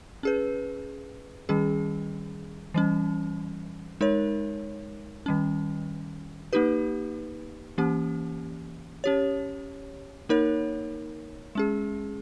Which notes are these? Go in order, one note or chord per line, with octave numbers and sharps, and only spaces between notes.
C#4 G#4 B4
D#3 G3 C#4 G#4
E3 G3 C#4
G#3 D#4 A#4 C#5
D#3 G3 C#4
A#3 D#4 G4 B4
E3 A#3 C#4 G4
C#4 G4 C#5
A#3 D#4 A#4 C#5
G#3 C#4 G#4